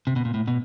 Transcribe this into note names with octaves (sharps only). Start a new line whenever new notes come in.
C3
B2
A#2
A2
B2